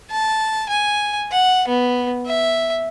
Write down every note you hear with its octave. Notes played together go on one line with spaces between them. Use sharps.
A5
G#5
F#5
B3
E5